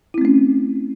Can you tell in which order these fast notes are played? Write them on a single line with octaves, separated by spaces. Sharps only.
E4 C4 A3 C#4